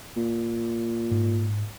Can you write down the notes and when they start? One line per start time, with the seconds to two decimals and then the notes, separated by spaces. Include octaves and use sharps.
0.16 A#2
1.11 G#2